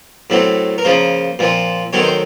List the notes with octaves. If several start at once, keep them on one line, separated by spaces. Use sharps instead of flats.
A2 F#3 A3 C4
A#4
C#3 F3 A#3 C5
A#2 F3 C4
D#3 F#3 A3 C4 C#5
C5